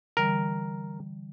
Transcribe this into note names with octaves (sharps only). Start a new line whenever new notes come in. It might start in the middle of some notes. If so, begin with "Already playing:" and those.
D3 E3 G3 A#4